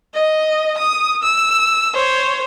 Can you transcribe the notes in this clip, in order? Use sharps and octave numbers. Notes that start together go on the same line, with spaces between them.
D#5
D#6
E6
C5 C#5